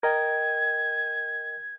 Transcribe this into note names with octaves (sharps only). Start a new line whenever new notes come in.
A#4 D#5 G5 G#6